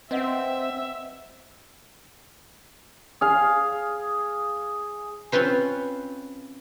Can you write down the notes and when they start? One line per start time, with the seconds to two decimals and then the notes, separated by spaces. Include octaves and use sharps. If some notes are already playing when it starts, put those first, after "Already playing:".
0.11 C4 B4 D#5 E5 F#5
3.21 G#4 F5
5.32 C4 C#4 F4 B4 C5